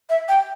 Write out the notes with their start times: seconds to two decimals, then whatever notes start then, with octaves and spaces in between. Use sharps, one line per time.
0.09 E5
0.29 G5